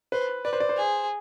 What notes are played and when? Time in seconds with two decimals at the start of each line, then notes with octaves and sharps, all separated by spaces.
0.12 B4 C5
0.45 B4 D5
0.53 C5
0.60 D5
0.69 C5
0.77 G#4